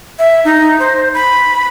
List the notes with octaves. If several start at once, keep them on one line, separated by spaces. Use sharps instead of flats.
E5
D#4
C5
B5